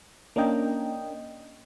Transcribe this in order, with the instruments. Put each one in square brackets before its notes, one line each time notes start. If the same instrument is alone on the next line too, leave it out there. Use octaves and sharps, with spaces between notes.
[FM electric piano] A#3 C#4 D4 A#4 D#5 G5